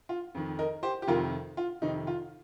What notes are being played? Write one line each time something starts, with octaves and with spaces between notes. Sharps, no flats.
F4
F2 D#3
A#4 D#5
G4 C5
G4
F2 C3 D#3 F4 A#4
F4
F2 C3 D#3 D#4
F4